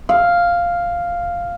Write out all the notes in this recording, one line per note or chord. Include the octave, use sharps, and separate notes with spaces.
F5